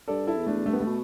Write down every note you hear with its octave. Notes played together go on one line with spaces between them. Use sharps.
G2 A4 D5
E4 A4
E2
A3 D4
G2 A3
B3
A3
B2